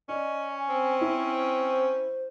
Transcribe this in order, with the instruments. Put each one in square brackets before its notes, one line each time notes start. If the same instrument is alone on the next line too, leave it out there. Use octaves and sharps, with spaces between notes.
[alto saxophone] C#4 [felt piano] D5 [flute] D#5
[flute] G#5
[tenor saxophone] C4
[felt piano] E4 [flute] C5